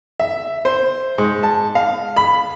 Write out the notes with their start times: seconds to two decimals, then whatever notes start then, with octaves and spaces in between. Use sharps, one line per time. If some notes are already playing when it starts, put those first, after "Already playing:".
0.20 E5
0.65 C5
1.18 G#2
1.43 A5
1.75 F5
2.16 B5